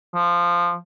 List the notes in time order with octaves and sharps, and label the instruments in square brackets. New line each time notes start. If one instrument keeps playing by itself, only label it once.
[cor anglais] F3